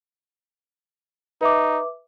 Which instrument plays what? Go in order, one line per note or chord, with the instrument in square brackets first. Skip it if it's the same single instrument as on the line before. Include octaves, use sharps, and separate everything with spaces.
[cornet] D#4 [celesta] B4 E5 D6